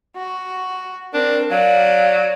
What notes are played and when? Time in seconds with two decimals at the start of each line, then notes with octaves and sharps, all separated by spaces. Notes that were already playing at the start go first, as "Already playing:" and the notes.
0.16 F#4
1.14 C4 D4 A#4
1.50 F#3 D5 F5